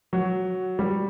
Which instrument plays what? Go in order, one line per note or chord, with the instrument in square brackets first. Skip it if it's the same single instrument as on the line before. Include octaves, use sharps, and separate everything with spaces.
[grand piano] F#3
G3